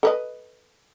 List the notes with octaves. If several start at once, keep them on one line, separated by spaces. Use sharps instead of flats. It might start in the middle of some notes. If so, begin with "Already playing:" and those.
A4 B4 D#5